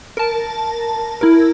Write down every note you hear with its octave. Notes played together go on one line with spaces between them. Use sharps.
A#4 A5
E4 A#4